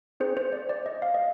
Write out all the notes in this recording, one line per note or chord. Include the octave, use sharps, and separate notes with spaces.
C4 D#4 G#4 C5
C5
D5
D5
D#5
F5
D#5